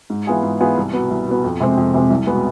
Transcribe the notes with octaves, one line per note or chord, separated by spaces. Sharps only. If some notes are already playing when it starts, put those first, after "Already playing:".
G#2
E3 B3 F4 G#4
G#2
E3 B3 F4 G#4
C2
B2 B3
C2
B2 B3
F2
C3 G#3 C4
F2
C3 G#3 C4
C2
B2 G#3 B3